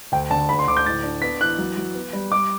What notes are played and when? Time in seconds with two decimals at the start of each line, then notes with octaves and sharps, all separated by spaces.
0.12 D2 G5
0.31 D3 A5
0.49 D2 B5
0.59 C6
0.67 D2 D6
0.77 G6
0.86 A2 A6
1.04 D4
1.22 B3 B6
1.41 E3 F#6
1.58 F#3
1.77 F#3
1.95 B3
2.13 G3
2.32 G3 D6